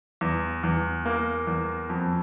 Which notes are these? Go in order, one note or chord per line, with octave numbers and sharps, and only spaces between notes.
E2
E2
A#3
E2
F2